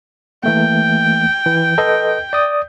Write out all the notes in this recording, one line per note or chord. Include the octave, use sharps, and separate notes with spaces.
E3 A3 A#3 G5
E3
A4 B4 D#5
D5 D#6